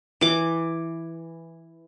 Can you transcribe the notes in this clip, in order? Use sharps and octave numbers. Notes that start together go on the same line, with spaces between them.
E3 D6